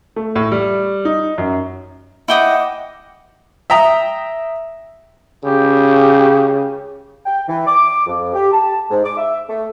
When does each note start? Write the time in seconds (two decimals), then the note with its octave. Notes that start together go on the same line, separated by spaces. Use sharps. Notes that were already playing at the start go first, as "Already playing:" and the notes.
0.16 A3
0.36 A2
0.52 G3
1.05 D#4
1.38 F#2
2.28 E4 D#5 F#5 G5 D6 D#6
3.70 E5 G5 A#5 D#6
5.45 C#3 G4
7.26 G5
7.48 E3
7.67 D6
8.06 F2
8.34 G4
8.52 A5
8.90 G#2
9.04 D6
9.17 E5
9.49 A3